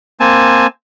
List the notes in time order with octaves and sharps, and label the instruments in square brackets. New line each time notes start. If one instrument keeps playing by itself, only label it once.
[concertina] A#3 C4 G#5 A5